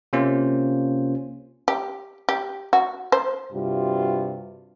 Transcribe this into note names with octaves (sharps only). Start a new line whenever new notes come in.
C3 A#3 C#4 F4 C5
G4
G4
F#4
C5
G2 C3 G3 F4 F#4